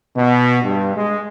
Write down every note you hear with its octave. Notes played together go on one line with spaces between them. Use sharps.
B2
G2
G#3